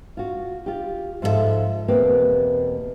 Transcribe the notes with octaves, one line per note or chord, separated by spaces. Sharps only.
F4 F#4
F4 G4
G#2 F3 F4 F#4 A4 E5
E2 B2 A#3 C4 G4 B4